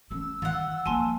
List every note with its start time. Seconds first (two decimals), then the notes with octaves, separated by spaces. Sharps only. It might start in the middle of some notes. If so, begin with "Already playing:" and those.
0.11 A3 C#4 E6
0.42 D#3 F4 F#5
0.86 F3 A#3 G#5 A5 C6